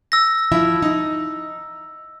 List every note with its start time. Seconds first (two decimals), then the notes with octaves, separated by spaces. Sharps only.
0.12 E6 A#6
0.52 F3 E4 E5
0.82 D#4